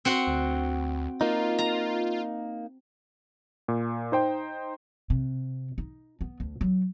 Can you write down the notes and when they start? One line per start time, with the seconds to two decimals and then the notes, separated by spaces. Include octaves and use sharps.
0.05 C4 F#4 F#5
0.27 D2
1.21 A#3 D#4 F4
1.59 A#5
3.68 A#2
4.12 D#4 C5 G5
5.10 C3
5.78 D#4
6.21 B3
6.40 D2
6.61 F#3